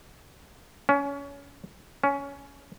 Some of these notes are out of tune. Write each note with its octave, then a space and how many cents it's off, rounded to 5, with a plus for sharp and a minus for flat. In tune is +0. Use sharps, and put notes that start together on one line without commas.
C#4 +25
C#4 +15